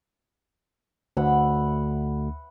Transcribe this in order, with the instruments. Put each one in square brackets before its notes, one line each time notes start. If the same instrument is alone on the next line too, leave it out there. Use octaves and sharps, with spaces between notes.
[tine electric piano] D2 [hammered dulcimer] E5 F#5 B5